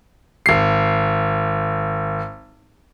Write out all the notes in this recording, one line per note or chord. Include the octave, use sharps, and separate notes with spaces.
G#1 C7